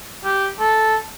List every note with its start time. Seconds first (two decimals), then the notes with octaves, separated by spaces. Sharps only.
0.25 G4
0.60 A4